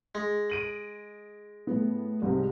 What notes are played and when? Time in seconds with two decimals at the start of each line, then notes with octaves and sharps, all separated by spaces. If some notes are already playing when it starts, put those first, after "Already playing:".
0.15 G#3
0.50 D7 D#7 F#7
1.67 A2 B3
2.22 C2 G#2 C3